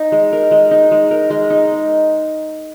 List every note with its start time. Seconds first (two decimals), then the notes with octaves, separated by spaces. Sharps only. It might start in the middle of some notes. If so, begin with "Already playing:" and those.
Already playing: D#4
0.12 G#3
0.32 A#4
0.51 G#3
0.71 D#4
0.91 G#3
1.11 A#4
1.30 G#3
1.50 D#4